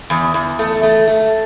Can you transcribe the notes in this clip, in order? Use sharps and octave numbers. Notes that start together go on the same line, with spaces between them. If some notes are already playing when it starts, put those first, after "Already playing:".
E2
E2
A3
A3
A3